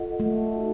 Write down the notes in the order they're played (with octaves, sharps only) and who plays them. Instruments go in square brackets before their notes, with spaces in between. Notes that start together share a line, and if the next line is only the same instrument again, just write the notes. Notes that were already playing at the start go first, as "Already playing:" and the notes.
Already playing: [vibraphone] F4 A4 D#5 F#5
[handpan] A3
[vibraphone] D#4 F#4